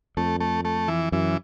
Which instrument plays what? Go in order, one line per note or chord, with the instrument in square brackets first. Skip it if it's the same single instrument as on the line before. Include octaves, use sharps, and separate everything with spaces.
[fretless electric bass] F2 [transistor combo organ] A3
[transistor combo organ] A3
A3
E3
[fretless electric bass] F#2 [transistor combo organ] E3